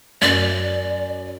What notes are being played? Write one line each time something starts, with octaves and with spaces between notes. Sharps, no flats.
F#2 D5